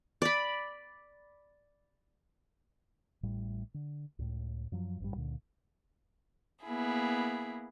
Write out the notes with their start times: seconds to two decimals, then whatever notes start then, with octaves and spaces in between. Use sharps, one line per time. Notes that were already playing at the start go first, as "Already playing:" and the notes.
0.22 D5 B5
3.23 A1 A2 G3
3.74 D3
4.19 C#2 A2
4.72 F#2 F3 F#3
5.00 A1 G2 G3
5.15 C#2 A#2 D3
6.63 A#3 B3 E4 G#4